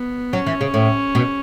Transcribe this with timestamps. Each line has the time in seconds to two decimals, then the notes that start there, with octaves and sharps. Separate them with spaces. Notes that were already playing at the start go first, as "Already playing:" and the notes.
Already playing: B3
0.32 F#3 C#4
0.46 E3
0.61 C#3
0.74 A2
1.15 B2